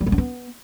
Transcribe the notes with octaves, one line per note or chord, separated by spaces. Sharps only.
G3
G#3
D4
B3